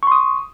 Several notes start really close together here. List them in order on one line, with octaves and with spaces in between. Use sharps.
C#6 C6 D#6